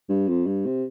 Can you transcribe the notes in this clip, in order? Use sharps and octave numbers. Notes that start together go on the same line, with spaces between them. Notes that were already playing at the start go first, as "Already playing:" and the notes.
G2
F2
G2
C3